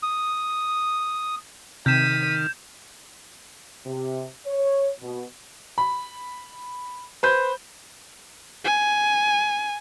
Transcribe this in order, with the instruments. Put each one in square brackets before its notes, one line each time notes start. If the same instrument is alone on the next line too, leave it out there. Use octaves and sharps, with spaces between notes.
[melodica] D#6
[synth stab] C3 [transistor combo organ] D#3 F6 [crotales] G6 E7 [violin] B6 D#7
[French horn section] C3
C#5
B2
[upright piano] B5
B4 C5 G6
[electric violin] G#5